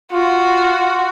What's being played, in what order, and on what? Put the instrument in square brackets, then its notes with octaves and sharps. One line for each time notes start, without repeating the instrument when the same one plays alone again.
[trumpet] F4 [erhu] F#4